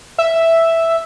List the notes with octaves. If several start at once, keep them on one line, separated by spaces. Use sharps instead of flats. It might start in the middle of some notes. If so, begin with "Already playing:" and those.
E5